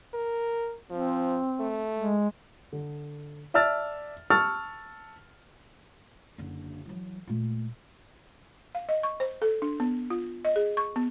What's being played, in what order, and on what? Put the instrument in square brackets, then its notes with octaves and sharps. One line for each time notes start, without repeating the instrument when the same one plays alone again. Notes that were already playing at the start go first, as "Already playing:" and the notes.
[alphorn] A#4
[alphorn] F3 [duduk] C4
[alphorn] A3
[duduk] G#3
[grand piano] D3
D5 E5 A5 E6 F6 A6
A5 C#6 E6 F6 A6
[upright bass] F#1 D3
E3 F#3
A#2 A3
[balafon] F5
D#5
C#6
C5
A4
D4
B3
F4
D#5
G#4
C#6
B3